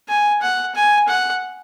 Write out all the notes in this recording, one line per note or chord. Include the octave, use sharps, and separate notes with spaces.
G#5
F#5
G#5
F#5